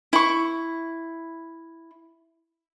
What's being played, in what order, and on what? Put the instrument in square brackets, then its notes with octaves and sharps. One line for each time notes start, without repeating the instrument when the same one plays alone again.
[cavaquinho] E4 C#6